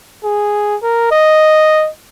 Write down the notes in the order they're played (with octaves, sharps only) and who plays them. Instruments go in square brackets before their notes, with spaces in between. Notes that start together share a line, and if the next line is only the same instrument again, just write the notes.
[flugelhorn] G#4
A#4
D#5